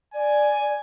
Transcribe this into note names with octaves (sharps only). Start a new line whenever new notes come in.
D5 G#5